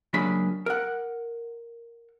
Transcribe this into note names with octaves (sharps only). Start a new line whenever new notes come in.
C#2 F#3 A#3 D4 G#4 B5
A#4 F#5